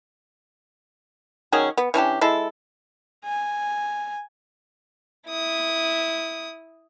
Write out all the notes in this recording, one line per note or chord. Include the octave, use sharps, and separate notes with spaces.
D#3 F#3 C#4 G#4
B3
E3 C#4 D4 G4
G#3 E4 A4
G#5
E4 D#6